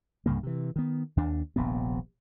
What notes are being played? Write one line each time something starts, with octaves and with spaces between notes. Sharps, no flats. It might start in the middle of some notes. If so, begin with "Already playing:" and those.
C2 G2 C#3 A#3
C3 E3
D#3 B3
D#2 D4
D#1 A#1 C3 B3